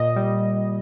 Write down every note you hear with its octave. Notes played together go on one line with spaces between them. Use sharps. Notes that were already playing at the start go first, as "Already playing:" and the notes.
Already playing: A#2 D#5
G3